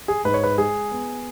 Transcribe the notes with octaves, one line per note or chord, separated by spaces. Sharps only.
G#4
G#2 B4
C#5
B4
G#3 G#4
B3